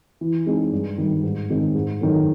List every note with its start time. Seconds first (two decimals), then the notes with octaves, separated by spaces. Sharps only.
0.21 E3
0.46 G#3 C4 D#4 G#4
0.72 G2
0.98 D#3 G3
1.23 G#2
1.50 D#3 G#3 C4
1.75 G#2
2.01 D#3 F#3 A3